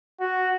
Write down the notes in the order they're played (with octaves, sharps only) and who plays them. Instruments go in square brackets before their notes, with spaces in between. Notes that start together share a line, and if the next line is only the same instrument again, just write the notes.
[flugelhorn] F#4